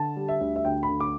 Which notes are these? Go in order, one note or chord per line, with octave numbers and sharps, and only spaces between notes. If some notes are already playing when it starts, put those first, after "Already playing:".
Already playing: D3 A5
G3
E5
D2
E5
D2 G5
B5
D3
D6